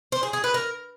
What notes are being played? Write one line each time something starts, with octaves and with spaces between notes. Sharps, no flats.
C5
G#4
G#4
B4
A#4